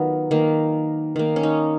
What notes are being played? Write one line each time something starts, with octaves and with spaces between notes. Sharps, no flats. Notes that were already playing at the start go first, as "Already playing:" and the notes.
Already playing: D#3 F#3 B3 F4
D#3 A#3
D#3 A#3
C#4
D#4